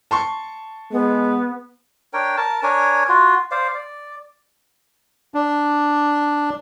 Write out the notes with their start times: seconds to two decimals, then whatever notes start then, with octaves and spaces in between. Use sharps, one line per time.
0.11 A5 C6 C#6
0.92 G#3 B3
2.13 D4 A#4 C#5 G5
2.37 A#4 A5
2.63 D4 A#4 C#5 G#5
3.09 F4 F#4
3.51 C5 D5 F5
3.74 D5
5.34 D4